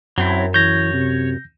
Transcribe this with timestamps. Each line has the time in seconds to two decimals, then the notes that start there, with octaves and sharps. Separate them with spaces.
0.18 F#2 F#3 C4 E4
0.54 E3 C#5 G6 A#6
0.93 C3